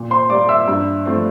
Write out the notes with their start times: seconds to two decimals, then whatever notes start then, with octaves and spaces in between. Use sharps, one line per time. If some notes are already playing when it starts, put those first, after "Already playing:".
Already playing: A#2
0.10 C5 C6
0.30 G3 D5 D6
0.34 A#3
0.49 E5 E6
0.68 G2
1.06 F3 A3 C4